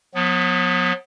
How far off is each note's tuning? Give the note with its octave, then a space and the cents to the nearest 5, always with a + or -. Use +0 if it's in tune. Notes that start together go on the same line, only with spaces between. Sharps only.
F#3 -45 B3 +0